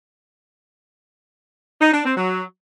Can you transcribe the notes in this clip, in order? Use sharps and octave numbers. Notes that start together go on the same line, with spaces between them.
D#4
D4
C4
F#3